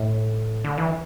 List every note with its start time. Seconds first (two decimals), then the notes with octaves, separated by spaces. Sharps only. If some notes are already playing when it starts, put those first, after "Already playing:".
Already playing: A2
0.64 D3
0.78 E3